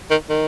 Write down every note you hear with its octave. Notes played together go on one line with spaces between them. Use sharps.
D#3
D#3